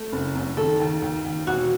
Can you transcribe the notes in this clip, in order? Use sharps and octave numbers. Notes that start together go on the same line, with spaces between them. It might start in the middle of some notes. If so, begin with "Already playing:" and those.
Already playing: A3
F#1
F#2
D#3 A4
D#2
D#2
D#2
E1 F#4